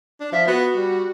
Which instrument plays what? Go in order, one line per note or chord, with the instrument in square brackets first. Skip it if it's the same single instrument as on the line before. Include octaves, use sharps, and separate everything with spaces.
[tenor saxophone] D4
[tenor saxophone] F3 [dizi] E5
[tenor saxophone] B3 [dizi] F#4
[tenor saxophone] G3